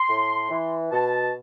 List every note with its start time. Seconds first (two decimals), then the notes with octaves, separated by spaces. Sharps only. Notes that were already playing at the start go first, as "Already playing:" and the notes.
Already playing: C6
0.09 A2
0.50 E3
0.92 B2 A5